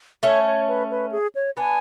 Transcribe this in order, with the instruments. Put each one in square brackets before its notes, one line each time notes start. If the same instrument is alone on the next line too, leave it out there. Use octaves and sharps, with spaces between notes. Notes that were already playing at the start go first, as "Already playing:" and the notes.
[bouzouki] A3 C#4 [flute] C#5
[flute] C#5
B4
B4
G#4
C#5
[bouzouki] B3 D4 [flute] G#5